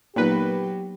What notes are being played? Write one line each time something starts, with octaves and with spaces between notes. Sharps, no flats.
A#2 F#3 A#3 B3 D#4 G4 B4